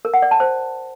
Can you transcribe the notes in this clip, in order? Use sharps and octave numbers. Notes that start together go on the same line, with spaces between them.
A#4
F#5
D5
A5
C5